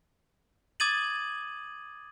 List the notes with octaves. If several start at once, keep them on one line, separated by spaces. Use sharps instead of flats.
D6 D#6 G#6 A6 D#7 F#7